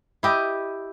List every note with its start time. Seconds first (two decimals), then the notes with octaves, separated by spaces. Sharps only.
0.23 E4 G4 D#5